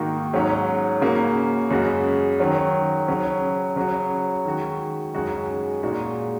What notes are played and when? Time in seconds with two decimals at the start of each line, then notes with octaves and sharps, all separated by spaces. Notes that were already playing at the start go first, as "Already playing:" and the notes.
Already playing: G#2 D#3 A#3 D#4 F#4
0.33 G#2 F#3 C#4
1.01 C#3 A#3 C#4 F#4
1.70 F#2 C#3 G#3 F#4
2.39 D#3 F#3 C#4
3.08 C#3 F#3 C#4
3.76 C#3 F#3 C#4 F#4
4.45 D#3 G#3 F#4
5.14 F#2 C#3 G#3 D#4 F#4
5.83 A#2 G#3 D#4 F#4